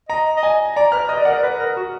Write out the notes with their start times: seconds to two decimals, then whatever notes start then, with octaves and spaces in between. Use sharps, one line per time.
0.09 D#5 A#5
0.37 D#5
0.43 G#5
0.76 D5 A#5
0.92 B4 F6
1.09 D#5 D#6
1.17 D5
1.25 A#4 F#5
1.34 D5
1.43 B4
1.59 A#4
1.76 F#4